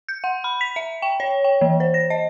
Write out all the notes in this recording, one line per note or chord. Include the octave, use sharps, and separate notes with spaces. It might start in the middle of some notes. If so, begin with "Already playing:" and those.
G6
F#5
B5
B6
E5
G5
C#5
G5
E3
C5
A#6
D#5